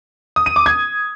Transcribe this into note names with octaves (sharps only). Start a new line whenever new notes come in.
D#6
D#7
D6
G#6